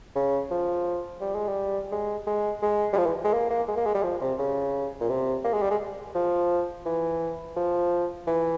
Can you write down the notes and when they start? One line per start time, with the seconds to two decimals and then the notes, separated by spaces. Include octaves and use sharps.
0.15 C#3
0.51 F3
1.21 G3
1.35 G#3
1.49 G3
1.92 G#3
2.27 G#3
2.62 G#3
2.93 G3
2.97 F3
3.06 E3
3.24 G#3
3.33 A#3
3.50 A#3
3.68 G#3
3.77 A#3
3.86 G#3
3.95 G3
4.03 F3
4.21 C3
4.39 C#3
5.01 A#2
5.09 C3
5.44 A#3
5.53 G#3
5.62 G3
5.71 G#3
6.15 F3
6.86 E3
7.56 F3
8.27 E3